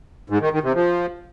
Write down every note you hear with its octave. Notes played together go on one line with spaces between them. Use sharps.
G#2
D#3
D#3
C3
F3